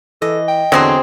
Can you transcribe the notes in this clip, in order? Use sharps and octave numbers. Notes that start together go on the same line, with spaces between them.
E3 A4 D#5
G5
E2 D3 F#3 C4 G#4 C#5 D#5 C6